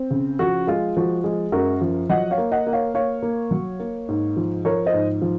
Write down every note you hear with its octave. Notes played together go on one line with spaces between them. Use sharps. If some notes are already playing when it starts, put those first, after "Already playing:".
Already playing: C4
C#3
F3 F#4
G#3 F4
F3 F#4
G#3
F#2 F#4 A#4
F3
F#3 D#5 F#5
C#5 F5
A#3
D#5 F#5
A#3
C#5 F5
A#3 C#5 F5
A#3
F#3
A#3
G#2
F3
F3 A#4 C#5
C5 D#5
G#2
F3